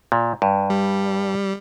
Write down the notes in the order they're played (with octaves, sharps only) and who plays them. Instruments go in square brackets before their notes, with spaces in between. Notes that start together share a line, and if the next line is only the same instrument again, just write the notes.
[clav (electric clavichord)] A#2
G2
[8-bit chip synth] G3